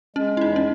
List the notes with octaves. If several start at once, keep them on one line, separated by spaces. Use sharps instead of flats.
G#3 C#4
E4
E2 D#4
C#4